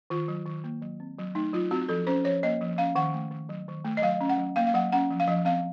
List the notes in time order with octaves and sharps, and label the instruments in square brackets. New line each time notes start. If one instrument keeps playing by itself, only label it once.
[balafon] D#3 F4
F#3
D#3
A#3
F#3
C4
F#3
A3 D#4
F#3 F4
C4 F#4
F3 A4
C#4 C5
F3 C#5
A#3 D#5
F3
C#4 F5
D#3 F#5
A3
D#3
F#3
D#3
A3
D#5
F#3 F5
C#4
F#5
F#3
A#3 F5
F5
F#3 F#5
C#4 F#5
F3
F5
F3 D#5
C4 F5